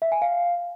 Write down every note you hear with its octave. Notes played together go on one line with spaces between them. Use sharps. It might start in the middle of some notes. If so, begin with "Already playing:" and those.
E5
G#5
F5